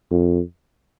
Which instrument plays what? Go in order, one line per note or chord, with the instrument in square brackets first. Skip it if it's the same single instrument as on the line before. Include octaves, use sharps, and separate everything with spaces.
[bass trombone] F2